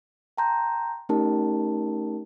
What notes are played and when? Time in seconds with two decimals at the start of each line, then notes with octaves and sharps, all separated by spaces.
0.38 G5 A5 A#5 C6 G6
1.09 A3 C#4 D#4 G4 A#4 A5